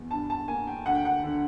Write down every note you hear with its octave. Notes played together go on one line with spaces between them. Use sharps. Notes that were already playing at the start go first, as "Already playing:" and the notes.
Already playing: E2
G2 A5
A5
A#3 G#5
G5
D2 F#5
G5
F#5
D3